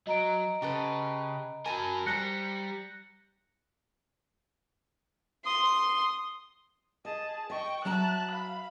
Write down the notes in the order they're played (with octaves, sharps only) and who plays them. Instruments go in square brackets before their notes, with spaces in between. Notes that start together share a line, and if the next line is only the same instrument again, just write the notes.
[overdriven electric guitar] F#3 [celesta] D#5 A#5 D7
[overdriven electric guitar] C#3 [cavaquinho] G4 A4 B4
[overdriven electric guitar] F#3 A#4 [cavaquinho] G#5 A5 B5
[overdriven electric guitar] G3 [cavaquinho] G4 C5 A#5 [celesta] F#6 A#6 C#7
[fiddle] C6 [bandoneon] D#6
[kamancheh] G#4 A5 [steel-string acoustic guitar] D#5
[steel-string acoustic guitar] D#5 [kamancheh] G5 C#6
[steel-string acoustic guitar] F#3 E5 A#5 [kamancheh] A5 F#6
[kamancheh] F5 B5